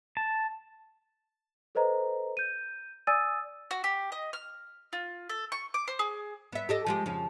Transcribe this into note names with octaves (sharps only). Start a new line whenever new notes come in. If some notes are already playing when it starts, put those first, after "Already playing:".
A5
A4 B4 C5 D#5 A#5
G6 D#7
D5 G#5 D#6 E6 A6 D#7
F#4
G4
D#5
F6
F4
A4
C#6
D6
C5
G#4
B3 E5
G4 A4 D#5
F3 G#3 G4
F2 C#3 F3